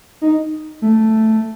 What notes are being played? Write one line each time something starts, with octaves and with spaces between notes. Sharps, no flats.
D#4
A3